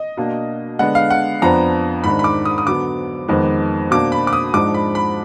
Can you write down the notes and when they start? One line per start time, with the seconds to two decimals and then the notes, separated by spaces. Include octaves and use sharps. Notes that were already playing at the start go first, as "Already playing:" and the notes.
Already playing: D#5
0.17 B2 A#3 D4
0.79 D3 G#3 B3 D4 F#5
0.95 F5
1.10 F#5
1.42 F2 F3 B3 D4 A#5
2.04 G#2 D#3 G#3 D4 B5
2.19 B5
2.24 D6
2.45 D#6
2.58 D#6
2.66 D3 F#3 B3 D6
3.28 F2 D#3 G#3 B3
3.91 B2 A#3 D4 D6
4.12 B5
4.27 D6
4.33 D#6
4.54 G#2 F3 G#3 D4 D6
4.74 B5
4.95 B5